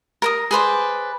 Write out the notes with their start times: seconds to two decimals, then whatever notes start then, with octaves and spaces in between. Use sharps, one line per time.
0.22 A#4 A#5 D#6
0.51 G#4 B4 C5 D5